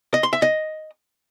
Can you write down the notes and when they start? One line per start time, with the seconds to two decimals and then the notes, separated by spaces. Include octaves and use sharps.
0.14 D#5
0.23 C6
0.33 E5
0.42 D#5